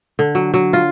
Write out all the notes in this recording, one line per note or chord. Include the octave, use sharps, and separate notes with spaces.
D3
F#3
F#3
F4